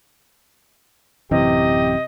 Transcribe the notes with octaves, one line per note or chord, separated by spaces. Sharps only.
A1 F#2 C3 E3 G4 D#5